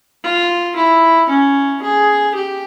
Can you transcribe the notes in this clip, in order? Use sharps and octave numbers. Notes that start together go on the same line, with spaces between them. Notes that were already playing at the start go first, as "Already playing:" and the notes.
F4
E4
C#4
G#4
G4